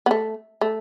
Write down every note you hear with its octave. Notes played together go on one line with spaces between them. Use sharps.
B3
A3
A3